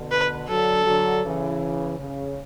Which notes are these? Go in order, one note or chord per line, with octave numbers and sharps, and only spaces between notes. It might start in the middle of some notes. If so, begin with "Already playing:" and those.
Already playing: B2 D3
B4
D3 F#3 A4
D3 F#3
C#3 E3
C#3